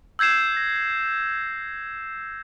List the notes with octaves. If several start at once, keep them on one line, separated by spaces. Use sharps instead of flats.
E6 G6 G#6 C7 E7
A#6